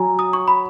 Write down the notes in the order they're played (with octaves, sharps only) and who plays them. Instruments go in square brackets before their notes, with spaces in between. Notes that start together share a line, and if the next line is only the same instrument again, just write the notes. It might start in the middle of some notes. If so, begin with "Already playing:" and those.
Already playing: [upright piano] F#3 [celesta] G#5 A#5
[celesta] D#6
C#6
B5